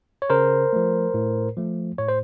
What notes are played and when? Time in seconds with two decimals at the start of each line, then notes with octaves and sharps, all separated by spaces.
0.22 C#5
0.30 C#3 A#4 C5
0.73 F3 A3
1.14 A2
1.57 F3 A3
1.98 A2 C#5
2.08 C5